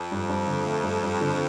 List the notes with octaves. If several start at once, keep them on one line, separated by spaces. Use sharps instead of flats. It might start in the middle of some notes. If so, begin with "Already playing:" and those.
Already playing: F2
G2
G2
D3
A3
G2
G2
D3